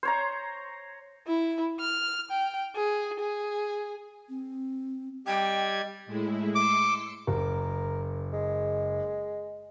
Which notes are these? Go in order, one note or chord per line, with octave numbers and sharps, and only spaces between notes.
C5 C#5 A#5
E4
F6
G5
G#4
G#4
C4
G3 D#5 G5 G#6
A2 G#3 E4
C6 D6 E6 C#7
F#1 A#4
G#3